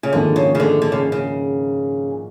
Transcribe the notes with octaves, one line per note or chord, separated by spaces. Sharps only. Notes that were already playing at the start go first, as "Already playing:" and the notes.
C#3
A#1 G#2 D3 D#3 G#3
C#3
C#3
D3
D3
C#3
C#3